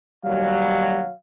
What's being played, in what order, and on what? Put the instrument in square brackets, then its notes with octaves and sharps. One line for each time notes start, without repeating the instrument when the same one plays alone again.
[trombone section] D#2 B2 F#3 [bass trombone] G3 [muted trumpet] F5